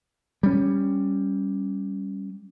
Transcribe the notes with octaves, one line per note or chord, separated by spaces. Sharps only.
G3 C#4